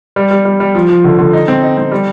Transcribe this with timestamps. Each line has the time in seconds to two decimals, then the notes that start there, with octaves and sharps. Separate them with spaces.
0.16 G3
0.31 G3
0.45 G3
0.60 G3
0.75 F3
0.89 F3
1.04 D3
1.19 D3
1.33 D#4
1.48 C4
1.62 D#4
1.77 C4
1.91 G3